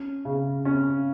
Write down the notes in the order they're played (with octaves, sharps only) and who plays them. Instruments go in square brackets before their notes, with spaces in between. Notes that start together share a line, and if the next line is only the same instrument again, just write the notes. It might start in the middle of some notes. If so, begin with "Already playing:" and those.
Already playing: [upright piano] C#4
C#3
C#4